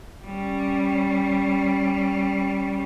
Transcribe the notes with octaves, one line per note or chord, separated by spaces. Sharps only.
G3 C#4